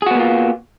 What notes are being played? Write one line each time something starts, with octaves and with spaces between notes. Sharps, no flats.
A#3 B3 F4 F#4 G#4